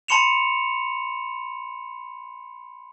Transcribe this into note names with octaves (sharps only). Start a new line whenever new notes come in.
A5 B5 C6 C#7 E7 F7